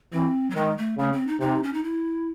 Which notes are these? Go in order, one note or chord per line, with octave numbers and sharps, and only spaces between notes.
E3 C4
F#3
D#3 G#3
A3
C#3 A3
C4
D#4
C3 D#4
C#4
D#4
E4